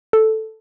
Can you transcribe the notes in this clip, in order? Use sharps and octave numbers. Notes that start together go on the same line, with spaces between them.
A4